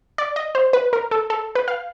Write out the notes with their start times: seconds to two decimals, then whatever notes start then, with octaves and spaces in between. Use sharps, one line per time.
0.18 D5
0.36 D#5
0.55 C5
0.73 B4
0.93 A#4
1.11 A4
1.30 A4
1.55 B4
1.68 F5